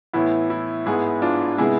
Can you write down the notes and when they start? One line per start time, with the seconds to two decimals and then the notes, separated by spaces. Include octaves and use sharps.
0.13 A2 E3 B3 E4
0.50 E4
0.86 G#2 G#3 B3 E4 G#4
1.22 D4 F4
1.58 C3 G#3 B3 E4 G#4